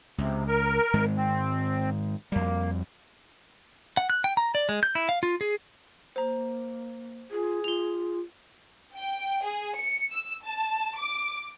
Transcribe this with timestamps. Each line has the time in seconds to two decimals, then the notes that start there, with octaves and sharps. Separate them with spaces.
0.18 C#2 C3
0.47 A#4
0.94 G#2 D#3 G#3
1.17 C4
2.32 F2 G3 A#3
3.97 F#5
4.10 F#6
4.24 G5
4.37 A#5
4.55 D5
4.69 G#3
4.83 G6
4.95 E4
5.09 F5
5.23 F4
5.41 G#4
6.16 A#3 C5 A#5
7.31 F4 G#4
7.64 F4 F7 G7
8.96 G5
9.44 G#4
9.76 C#7
10.11 E6
10.45 A5
10.97 D6